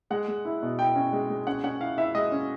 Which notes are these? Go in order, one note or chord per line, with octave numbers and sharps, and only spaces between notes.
G#3 F#5
G#3
E4
B2
E4 G5
C#4
G#3
G#3
C#4 F#5
C#4 F#5
E4 F5
E4 E5
G#3 D#5
C#4